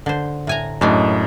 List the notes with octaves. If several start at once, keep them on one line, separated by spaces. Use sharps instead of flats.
D3 C5
A2 G#5 A#5
F#2 A2 G#3 D4 D#4